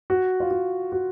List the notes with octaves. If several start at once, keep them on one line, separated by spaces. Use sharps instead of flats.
F#4
F4
F#4
F#4